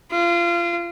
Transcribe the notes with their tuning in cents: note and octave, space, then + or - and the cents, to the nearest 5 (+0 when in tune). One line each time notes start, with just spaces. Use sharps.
F4 -25